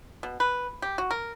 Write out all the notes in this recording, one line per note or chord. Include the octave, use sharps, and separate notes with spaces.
B2
B4
G4
F#4
A#4